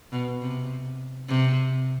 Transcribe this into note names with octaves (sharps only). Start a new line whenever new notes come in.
B2
C3
C3